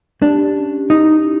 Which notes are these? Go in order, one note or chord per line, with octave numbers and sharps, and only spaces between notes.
D4 G4
C#4
D#4 E4
E4